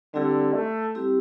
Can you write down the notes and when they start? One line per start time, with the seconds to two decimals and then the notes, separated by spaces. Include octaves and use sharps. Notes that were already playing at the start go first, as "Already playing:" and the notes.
0.14 D3 G3 C4 E4 G4
0.54 A3
0.95 G3 C4 E4 G4